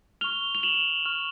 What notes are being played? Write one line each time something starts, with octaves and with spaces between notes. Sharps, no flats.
C#6 F6 F7 G7
F7
E7 F#7
C#6 F6